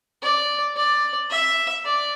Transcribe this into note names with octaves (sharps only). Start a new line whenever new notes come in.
D5
D5
E5
D5